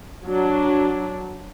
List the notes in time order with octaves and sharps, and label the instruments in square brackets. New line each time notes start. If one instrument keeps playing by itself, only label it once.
[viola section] F#3 D4